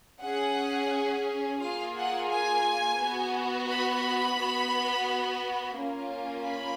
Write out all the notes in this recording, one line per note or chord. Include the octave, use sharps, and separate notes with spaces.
C#4 G#4 F#5
A#3 F4 G#4 F5
F#5
G#5
B3 F#4
B5
B3 F#4
A#3 C#4 F4
B5